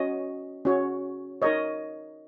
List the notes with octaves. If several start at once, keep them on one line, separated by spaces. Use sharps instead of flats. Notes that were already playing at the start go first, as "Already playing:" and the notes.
Already playing: C#4 F#4 C#5 D#5
C#4 F#4 C#5
D#4 A#4 C#5 D#5